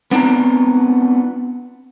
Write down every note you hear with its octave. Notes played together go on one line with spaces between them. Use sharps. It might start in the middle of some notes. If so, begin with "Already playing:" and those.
B3 C4 D4 F4 A#5